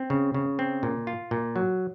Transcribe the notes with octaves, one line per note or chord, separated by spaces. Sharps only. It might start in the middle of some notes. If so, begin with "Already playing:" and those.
Already playing: C4
C#3
C#3
C4
A#2
F4
A#2
F#3